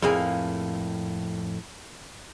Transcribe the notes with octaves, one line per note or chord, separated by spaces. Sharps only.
F2 A2 A#3 G#4